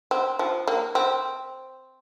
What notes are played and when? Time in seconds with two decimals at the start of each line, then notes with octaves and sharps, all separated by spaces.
0.11 C4
0.39 F3
0.67 A#3
0.95 C4